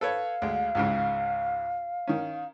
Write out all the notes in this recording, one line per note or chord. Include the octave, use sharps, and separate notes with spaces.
A4 B4 C#5 F5
D2 G#3
C#2 G#2 C#3
D#3 C#4